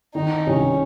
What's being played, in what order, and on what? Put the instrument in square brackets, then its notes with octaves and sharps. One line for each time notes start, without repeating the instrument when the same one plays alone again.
[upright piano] D#3 [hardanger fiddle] D#4
[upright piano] C2 [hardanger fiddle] C#4